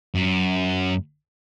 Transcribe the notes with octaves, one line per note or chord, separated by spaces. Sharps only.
F#2